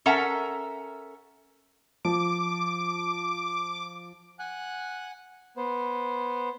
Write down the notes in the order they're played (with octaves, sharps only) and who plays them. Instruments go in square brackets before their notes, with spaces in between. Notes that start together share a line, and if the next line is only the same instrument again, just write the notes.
[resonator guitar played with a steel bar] C#4 A4 A#4 E5 F#5 A#5
[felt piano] F3 [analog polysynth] D6
[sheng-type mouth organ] F#5 G#5 F#6
B3 C5